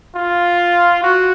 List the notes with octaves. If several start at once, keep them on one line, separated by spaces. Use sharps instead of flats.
F4
F#4